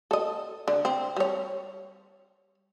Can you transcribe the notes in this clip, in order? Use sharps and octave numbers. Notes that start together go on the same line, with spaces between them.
A4 D#5
D3
C4
G3 C#5